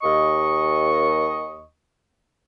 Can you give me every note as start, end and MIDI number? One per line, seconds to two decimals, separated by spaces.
0.03 1.66 39
0.03 1.66 75
0.03 1.66 85